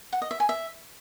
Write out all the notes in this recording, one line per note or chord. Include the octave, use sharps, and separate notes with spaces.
F#5
D#5
E5
G#5
E5